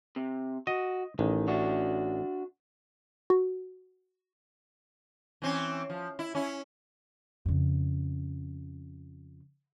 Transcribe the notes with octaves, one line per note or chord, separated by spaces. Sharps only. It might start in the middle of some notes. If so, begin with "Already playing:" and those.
C3
F#4 D#5
A1 D#3
D4 F#4
F#4
E3 C4 C#4
F3
E4
C#4 E4
F2 C#3